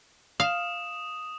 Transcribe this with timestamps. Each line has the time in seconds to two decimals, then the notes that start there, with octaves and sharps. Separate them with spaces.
0.40 F5 D#6 E7